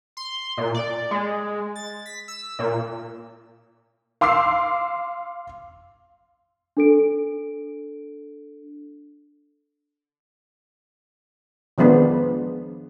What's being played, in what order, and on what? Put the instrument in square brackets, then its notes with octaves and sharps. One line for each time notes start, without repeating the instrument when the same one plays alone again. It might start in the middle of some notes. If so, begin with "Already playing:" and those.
[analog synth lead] C6
A#2
D5
G#3
A6
B6
E6
A#2
[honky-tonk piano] F5 C6 D6 E6 C7
[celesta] D4 A4 D7
[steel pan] D#3 F3 G#3 B3 D4